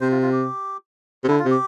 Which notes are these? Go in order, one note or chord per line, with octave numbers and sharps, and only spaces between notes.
C3 C5
F4
F4
G4
C3
D3 E4
F4
C3
G4